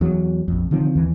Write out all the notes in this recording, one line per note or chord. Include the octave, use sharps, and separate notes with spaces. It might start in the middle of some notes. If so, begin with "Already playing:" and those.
E2 F#3
A#1 F2
D3 D#3 F3 C4
D#2 E3